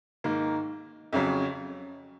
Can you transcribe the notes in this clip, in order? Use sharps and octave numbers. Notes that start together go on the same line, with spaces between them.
G#2 D#3 A#3
F2 C#3 F#3 C#4